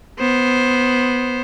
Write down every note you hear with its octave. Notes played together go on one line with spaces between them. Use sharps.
B3 C5